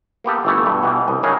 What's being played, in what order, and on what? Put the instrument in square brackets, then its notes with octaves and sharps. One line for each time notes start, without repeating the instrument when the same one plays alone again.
[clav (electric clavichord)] A#3 B3 G4 A4
G1 E3 A3 B3
G2 B2
B2 E3 G3
C2 D#5
C#3 F#3 D#4 G#4 A#4